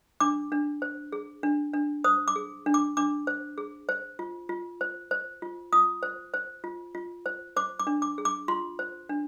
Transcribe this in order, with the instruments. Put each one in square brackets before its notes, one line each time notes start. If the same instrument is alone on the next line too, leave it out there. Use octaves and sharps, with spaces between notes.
[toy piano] D4 D6
D4
C5
G#4
D4
D4
C5 D#6
D6
G#4
D4
D6
D4 D6
C5
G#4
C5
F4
F4
C5
C5
F4
F4 D#6
C5
C5
F4
F4
C5
C5 D6
D6
D4
D6
G#4
D6
F4 C6
C5
D4